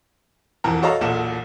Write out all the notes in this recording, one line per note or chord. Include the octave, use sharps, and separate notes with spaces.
E1 F2 E3 A#4
F#4 A4 C#5 D#5 F5 A#5
E1 B1 A#2 A4 F#5 E7